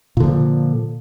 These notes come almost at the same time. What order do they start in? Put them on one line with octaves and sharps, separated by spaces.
A#2 D3 F3